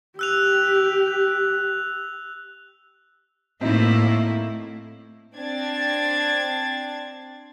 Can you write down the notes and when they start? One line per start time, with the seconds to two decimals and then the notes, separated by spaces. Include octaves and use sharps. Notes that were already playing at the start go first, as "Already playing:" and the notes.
0.19 G4 E6 F#6 F7
3.61 A2 A3 A#3 C4 D#4 E4
5.35 C4 D4 G#6 A6